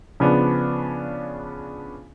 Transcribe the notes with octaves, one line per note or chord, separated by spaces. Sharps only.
C#3 F3 B3 D4